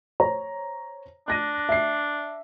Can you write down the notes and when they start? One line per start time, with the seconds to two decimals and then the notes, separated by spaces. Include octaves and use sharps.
0.20 C5 C#5 A#5
1.28 D4 F#6 A#6 D#7
1.69 E5 C7